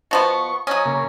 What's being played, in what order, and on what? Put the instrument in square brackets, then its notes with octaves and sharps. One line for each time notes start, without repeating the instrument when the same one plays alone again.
[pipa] B2 F3 B3 [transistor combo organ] C#6
[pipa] F#3 C#4 [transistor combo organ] D#5 D#6
[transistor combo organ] C#3 A#3